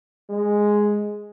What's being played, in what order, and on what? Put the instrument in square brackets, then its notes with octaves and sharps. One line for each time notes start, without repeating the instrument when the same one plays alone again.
[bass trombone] G#3